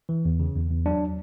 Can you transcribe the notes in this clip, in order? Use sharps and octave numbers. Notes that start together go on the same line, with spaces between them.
E3
E2
C#3
E2
E2
F#3 D4